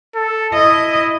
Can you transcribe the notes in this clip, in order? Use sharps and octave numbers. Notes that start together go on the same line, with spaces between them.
A4
E4 D#5